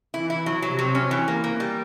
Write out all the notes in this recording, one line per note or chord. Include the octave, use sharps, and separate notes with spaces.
E3 E4
E4
F#3
C3 F#3
F#3
C#4
E3
A#3
A#3
G3